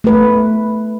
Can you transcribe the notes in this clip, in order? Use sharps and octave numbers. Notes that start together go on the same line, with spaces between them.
A3 B4